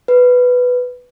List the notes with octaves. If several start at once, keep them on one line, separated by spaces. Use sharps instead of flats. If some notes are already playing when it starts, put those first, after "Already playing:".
B4